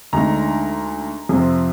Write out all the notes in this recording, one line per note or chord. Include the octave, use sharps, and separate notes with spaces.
D2 D3 G#3 D#4 A#5
F2 C3 F3 C4